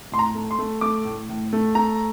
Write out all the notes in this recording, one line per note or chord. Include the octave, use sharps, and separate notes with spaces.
A2 C6
A#5
A3
C6
A3
A3 D6
A2
A2
A3
A3 A#5